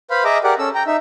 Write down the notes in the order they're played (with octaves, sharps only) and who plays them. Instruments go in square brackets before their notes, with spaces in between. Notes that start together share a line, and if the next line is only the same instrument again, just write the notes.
[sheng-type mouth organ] B4 C5 F5 B5
G#4 D#5 E5 A#5 D6
G4 G#4 A#4 D5 F#5
C#4 A4 E6
G5 A#5
D#4 E5